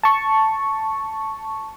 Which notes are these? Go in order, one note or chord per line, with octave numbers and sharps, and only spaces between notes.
A5 C#6